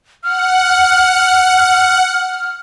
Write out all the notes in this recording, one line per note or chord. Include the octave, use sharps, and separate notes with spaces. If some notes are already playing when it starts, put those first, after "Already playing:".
F#5 F6